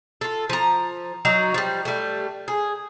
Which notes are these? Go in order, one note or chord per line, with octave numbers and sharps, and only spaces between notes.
F4 A4
F3 A#5
F#3 D#4 F#4
F3 G3
G3 A3
G#4